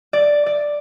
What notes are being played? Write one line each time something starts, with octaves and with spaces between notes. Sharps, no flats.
D5
D5